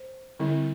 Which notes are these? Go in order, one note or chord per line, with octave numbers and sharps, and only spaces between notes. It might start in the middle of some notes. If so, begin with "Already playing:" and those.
Already playing: C5
D3 G3 C4 E4